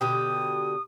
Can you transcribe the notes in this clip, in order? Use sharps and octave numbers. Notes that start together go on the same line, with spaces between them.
B2 D3 G4 D#6